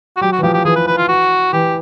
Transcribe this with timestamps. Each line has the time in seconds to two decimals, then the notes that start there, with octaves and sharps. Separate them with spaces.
0.17 F#4
0.21 F#3 G4
0.32 F#4
0.39 E3
0.43 F3 G4
0.54 G4
0.65 E3 G#4
0.76 B4
0.87 B4
0.98 F4
1.08 F#4
1.53 E3 G4